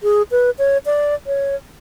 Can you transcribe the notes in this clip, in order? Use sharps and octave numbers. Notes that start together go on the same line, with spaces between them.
G#4
B4
C#5
D5
C#5